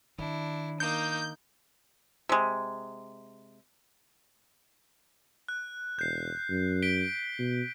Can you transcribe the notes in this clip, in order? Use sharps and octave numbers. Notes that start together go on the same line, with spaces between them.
D#3 D4 E4
A#3 D#4 G6
C3 G#3
F#6
E1 G6 C7
F#2
B6 D7 G7
B2